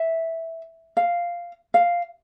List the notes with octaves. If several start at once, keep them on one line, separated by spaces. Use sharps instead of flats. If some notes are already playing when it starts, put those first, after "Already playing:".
Already playing: E5
F5
F5